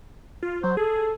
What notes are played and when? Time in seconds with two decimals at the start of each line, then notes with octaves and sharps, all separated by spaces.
0.43 F4
0.63 F#3 C5
0.77 G#4 A4